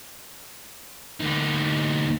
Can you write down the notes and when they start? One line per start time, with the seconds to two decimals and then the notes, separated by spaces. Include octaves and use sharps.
1.20 D2 D#4